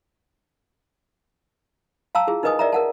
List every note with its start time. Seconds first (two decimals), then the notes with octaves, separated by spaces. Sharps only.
2.15 F5 A5 A#5 E6
2.27 E4 F4 G#4
2.43 D#4 A#4 B4 D#5 G#5 D#6
2.59 A#4 D5 E5 A#5
2.72 A#4 F#5 A5